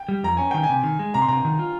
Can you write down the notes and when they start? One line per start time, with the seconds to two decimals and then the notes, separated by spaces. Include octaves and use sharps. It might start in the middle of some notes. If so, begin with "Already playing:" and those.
Already playing: G5
0.09 G3
0.23 F2 A#5
0.37 C#4 G#5
0.51 D#3 G5
0.63 G#5
0.69 C3
0.83 D#3
0.99 G#3
1.14 C3 A#5
1.22 C6
1.28 C3 A#5
1.45 D#3
1.59 F4